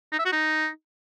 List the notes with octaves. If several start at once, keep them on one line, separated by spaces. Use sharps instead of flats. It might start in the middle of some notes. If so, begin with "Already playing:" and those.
D#4
E5
F#4
D#4